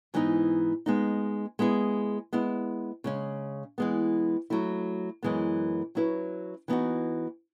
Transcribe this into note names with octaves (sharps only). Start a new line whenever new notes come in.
G#2 E3 B3 D#4
G#3 B3 D#4
G#3 B3 E4 G#4
G#3 B3 E4
C#3 G#3 C#4
E3 G#3 B3
F#3 A3 E4
F#2 E3 G#3 B3
F#3 C#4 E4 B4
E3 B3 D#4 F#4